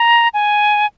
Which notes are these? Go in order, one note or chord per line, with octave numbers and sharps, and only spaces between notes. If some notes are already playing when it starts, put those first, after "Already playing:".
Already playing: A#5
G#5